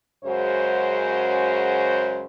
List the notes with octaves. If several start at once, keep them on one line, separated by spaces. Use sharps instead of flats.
F#2 C#3 G#3 F#4 C5